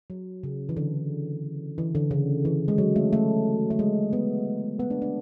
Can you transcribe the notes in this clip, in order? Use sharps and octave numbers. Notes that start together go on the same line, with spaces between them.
F#3
C#3
E3
D3
E3
D3
C#3
E3
G#3
F#3
A3
A3
A3
G#3
B3
B3
D4
D4